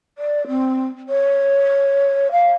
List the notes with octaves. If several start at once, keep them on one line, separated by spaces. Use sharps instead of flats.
D5
C4
C#5
F5